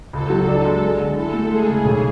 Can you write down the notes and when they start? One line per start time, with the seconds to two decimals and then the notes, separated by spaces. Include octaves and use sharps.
0.13 C#2 A4
0.30 F#3
0.48 D4
0.65 G#3
0.82 G#3
1.00 D3
1.16 E4 A4
1.33 A3
1.51 G#3 G#4
1.67 C#3
1.85 B1